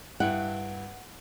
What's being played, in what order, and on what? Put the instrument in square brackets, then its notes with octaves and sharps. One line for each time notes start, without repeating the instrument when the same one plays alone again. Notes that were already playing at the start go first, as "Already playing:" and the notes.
[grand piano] G2 E4 G5 [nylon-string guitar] F#5